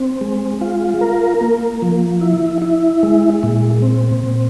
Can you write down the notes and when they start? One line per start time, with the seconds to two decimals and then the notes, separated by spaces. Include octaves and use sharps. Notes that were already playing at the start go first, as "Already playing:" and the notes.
Already playing: C4
0.21 G#3
0.61 F4
1.01 A#4
1.41 A#3
1.82 F3
2.21 E4
2.62 E4
3.03 G#3
3.43 A#2
3.82 C4
4.24 A#2